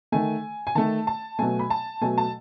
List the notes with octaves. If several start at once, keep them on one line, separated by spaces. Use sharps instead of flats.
D#3 A3 G#5
G#5
D#3 A3 A5
A5
B2 F#3 A3 G#5
B5
A5
B2 F#3 A3 G#5
A5